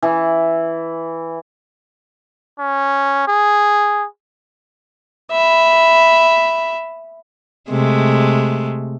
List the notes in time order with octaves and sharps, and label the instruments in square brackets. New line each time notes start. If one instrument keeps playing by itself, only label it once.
[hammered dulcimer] E3
[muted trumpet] C#4
G#4
[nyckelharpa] E5 B5
[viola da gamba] C3 G#3 A3